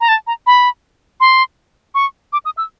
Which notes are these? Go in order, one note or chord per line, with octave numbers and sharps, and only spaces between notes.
A#5
A5
A#5
B5
C6
C#6
D6
D#6
E6